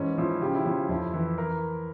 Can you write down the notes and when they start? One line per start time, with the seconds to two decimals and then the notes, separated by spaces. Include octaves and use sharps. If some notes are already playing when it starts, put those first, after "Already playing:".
Already playing: G#2 E3 C#4
0.18 F3 E4
0.41 C#3 G4
0.55 E4
0.65 F3 C#4
0.89 F2 E4
1.13 E3 E4
1.38 A#4